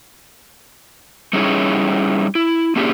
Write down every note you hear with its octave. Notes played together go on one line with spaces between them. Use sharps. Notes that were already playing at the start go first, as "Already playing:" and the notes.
G3 C#4 D#4 E4 G#4 C#5
E4
A#3 C#4 D4 E4 G4 G#4